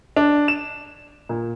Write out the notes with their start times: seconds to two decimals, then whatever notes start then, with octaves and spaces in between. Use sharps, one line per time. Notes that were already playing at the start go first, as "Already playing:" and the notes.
0.16 D4
0.48 E7
1.29 A#2